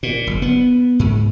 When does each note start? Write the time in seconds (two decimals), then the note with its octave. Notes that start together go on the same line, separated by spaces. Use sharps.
0.03 A#2
0.27 F#1
0.42 B3
0.99 G#2